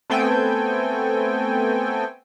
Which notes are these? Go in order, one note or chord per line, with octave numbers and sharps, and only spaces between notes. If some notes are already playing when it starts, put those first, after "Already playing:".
A3 B3 C4 A4 G5 G#5